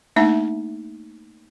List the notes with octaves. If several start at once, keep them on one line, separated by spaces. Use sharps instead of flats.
A3 A#3 D4 D#4 E5